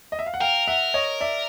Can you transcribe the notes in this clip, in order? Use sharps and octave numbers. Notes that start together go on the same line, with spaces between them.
D#5
E5
F5
F#5
A#4 F5 G5
E5 F#5
C#5 D#5
D5 E5